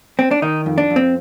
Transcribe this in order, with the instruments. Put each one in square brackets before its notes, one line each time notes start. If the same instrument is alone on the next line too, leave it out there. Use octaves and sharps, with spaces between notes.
[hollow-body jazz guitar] C4
D4
D#3 D#4
F2
D4
F2
C4